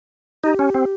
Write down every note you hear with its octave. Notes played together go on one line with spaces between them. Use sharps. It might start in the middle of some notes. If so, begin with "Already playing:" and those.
D#4 G4
C#4
C4